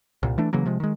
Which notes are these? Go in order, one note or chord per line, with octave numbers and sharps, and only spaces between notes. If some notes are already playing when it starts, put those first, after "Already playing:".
C2 A#2
E3 A3 D4
C#3 E3 F#3 A#3
C3 F3 G#3
D#3 G#3